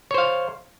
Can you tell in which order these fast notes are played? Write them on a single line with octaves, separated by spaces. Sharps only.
C#5 C5 F5